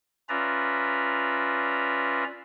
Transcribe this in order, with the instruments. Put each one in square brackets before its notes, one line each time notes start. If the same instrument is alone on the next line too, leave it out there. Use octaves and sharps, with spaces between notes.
[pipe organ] C#4 F4 B4 D5 E5 A#5